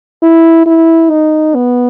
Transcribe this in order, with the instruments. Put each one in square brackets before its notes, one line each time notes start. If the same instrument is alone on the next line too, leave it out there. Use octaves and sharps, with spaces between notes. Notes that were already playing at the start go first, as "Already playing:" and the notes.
[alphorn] E4
E4
D#4
B3